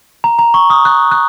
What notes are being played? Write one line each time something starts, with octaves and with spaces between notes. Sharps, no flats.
A#5
A#5
C#6
D#6
F#6
F#6